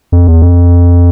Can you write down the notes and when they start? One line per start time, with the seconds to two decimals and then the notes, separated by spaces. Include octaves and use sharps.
0.12 F2
0.27 E2
0.42 F2